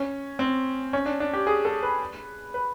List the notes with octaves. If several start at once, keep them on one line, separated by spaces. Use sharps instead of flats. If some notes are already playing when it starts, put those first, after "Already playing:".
Already playing: C#4
C4
C#4
D4
D4
G4
G#4
A4
B4
B4